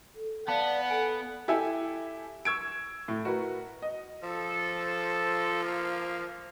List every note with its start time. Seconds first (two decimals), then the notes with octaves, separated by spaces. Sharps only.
0.15 A4
0.48 B3 D5 F5 F#5 A5
0.90 A4 G#5
1.48 E4 G4 A4 E5 G#5
2.45 C#6 E6 G#6 D7
3.08 A2
3.25 F#4 A#4 B4
3.82 D#5
4.23 F3 A4
5.63 A#3 F5